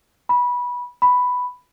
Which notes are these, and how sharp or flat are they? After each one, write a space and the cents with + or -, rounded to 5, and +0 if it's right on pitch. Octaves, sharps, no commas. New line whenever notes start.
B5 -15
B5 +5